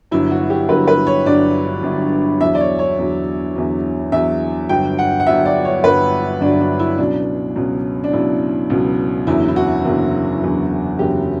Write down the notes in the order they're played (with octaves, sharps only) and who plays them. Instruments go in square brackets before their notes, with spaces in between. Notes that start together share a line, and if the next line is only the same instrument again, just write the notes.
[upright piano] G1 G2 D3 F#3 E4
F#4
G4
G1 G2 D3 F#3 B4
B4
C#5
G1 G2 D3 F#3 D5
G1 G2 D3 F#3
E2 D3 F#3 E5
D5
C#5
C#5
E2 D3 F#3
E2 D3 F#3
E2 D3 F#3 E5
G1 G2 F#3 G5
F#5
F#5
G1 G2 F#3 E5
D5
C#5
G1 G2 F#3 B4
G1 G2 F#3 D4
D4
E4
C#2 B2 F#3 D4
C#2 B2 F#3
D4
C#2 B2 F#3 E4
C#2 B2 F#3
F#1 E2 D3 F#3 E4
E4
F#4
F#1 E2 D3 F#3
F#1 E2 D3 F#3
F#1 E2 D3 F#3 G4